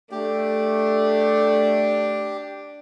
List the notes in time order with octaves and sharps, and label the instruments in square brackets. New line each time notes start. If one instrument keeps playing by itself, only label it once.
[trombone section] A3 [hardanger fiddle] D4 [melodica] G4